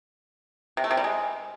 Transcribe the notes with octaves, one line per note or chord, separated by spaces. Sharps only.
C3
A3
C3
G3
G#3